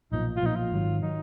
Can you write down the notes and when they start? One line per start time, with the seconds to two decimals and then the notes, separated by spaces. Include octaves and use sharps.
0.12 B1 A#2 F3 D#4
0.37 F4
0.42 B1 A#2 F3 D#4
0.56 F4
0.72 G#1 G#2 D#3 F#3
1.02 D#3 F#3 D#4